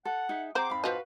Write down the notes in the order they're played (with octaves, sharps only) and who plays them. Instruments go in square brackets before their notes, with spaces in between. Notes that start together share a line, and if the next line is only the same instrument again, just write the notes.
[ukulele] A4 [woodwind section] F#5
[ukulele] D#4 G#4 E5
[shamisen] C4 C5 [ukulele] G#4 A#5 [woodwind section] F#5 C6 D6
[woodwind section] F2 G#2 [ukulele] F5 B5
[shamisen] F3 D#5 [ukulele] F#4 B4 F5